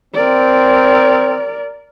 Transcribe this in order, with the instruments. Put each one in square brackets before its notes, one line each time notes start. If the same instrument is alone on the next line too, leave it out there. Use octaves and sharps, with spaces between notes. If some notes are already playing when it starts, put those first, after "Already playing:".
[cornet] C4 [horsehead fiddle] A#4 D5